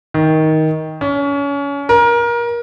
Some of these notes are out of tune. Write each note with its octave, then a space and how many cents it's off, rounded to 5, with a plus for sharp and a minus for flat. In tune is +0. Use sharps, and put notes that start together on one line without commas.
D#3 +15
C#4 +30
A#4 +25